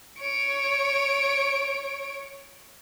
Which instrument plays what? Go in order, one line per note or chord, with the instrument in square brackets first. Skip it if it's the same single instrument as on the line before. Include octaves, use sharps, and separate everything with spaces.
[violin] C#5 D7